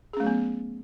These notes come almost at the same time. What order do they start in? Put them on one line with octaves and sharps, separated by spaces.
G#4 C#4 A3 F#3 B3